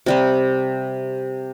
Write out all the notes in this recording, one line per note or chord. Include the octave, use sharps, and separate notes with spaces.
C3 G3 C4